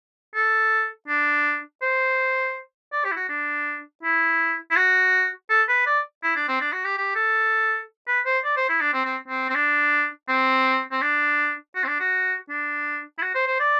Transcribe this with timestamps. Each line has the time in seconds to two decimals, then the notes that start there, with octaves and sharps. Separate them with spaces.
0.35 A4
1.08 D4
1.82 C5
2.93 D5
3.05 G4
3.12 E4
3.17 F#4
3.29 D4
4.03 E4
4.71 E4
4.76 F#4
5.50 A4
5.68 B4
5.87 D5
6.23 E4
6.36 D4
6.48 C4
6.61 D4
6.73 F#4
6.85 G4
6.98 G4
7.15 A4
8.08 B4
8.26 C5
8.44 D5
8.57 C5
8.69 E4
8.81 D4
8.93 C4
9.05 C4
9.28 C4
9.50 C4
9.55 D4
10.28 C4
10.92 C4
11.02 D4
11.75 F#4
11.84 C4
11.88 D4
12.00 F#4
12.49 D4
13.18 E4
13.22 F#4
13.35 C5
13.47 C5
13.60 D5